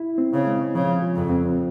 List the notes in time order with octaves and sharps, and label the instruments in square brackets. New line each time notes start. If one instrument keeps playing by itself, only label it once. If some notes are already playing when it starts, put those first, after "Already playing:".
Already playing: [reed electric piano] E4
C4
[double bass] C#3
[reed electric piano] G#3
[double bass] C#3 [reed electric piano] F3
[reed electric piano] F4
[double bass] F2
[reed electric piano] C4